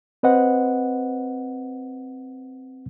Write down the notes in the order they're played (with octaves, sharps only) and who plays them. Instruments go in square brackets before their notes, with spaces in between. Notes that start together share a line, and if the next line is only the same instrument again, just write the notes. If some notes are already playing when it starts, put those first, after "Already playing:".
[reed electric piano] C4 B4 C5 D#5 F#5